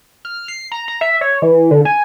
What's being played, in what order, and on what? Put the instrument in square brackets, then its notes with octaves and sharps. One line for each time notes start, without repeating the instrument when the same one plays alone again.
[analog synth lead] F6
C7
A#5
A#5
E5
C#5
E3
D3
G#5